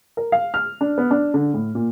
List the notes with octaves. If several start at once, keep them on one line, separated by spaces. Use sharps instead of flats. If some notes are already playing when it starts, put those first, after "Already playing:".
A#4
F5
F6
D4
B3
D4
D3
A2
A#2